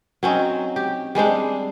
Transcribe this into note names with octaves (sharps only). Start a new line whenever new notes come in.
F#3 C4 C#4 D#4
G4
G3 G#3 C4 D4